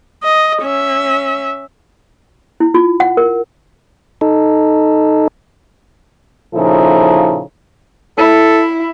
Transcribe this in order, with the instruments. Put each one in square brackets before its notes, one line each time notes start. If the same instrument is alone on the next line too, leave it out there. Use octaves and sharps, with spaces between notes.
[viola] D#5
C#4 E5
[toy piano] E4
F4
F#5
A#4
[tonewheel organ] D#4 A4
[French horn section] A#2 C#3 F3 D#4 E4 A4
[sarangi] E4 [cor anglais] A4